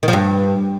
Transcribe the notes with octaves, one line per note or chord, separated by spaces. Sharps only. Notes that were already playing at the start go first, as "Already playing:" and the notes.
D#3
F3
G2